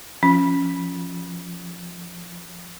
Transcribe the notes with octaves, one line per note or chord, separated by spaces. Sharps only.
F3 C#4